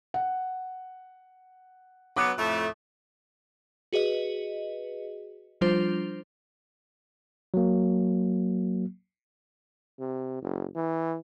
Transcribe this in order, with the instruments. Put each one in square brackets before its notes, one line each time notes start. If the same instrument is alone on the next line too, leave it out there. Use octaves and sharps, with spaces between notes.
[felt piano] F#5
[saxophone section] F#3 B3 [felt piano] D6 D#6 F#6
[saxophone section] F2 A2 A3
[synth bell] F#4 G#4 B4 D#5
F3 G3 D4 F4 C5
[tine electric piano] F#3 A#3
[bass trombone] C3
F#1
E3